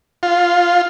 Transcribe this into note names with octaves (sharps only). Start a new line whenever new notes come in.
F4